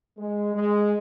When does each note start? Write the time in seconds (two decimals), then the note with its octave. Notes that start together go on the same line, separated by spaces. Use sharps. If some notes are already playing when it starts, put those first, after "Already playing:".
0.18 G#3
0.54 G#3